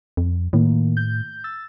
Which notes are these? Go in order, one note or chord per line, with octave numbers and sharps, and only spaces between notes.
F2
A2 D#3 A#3
G6
E6 A6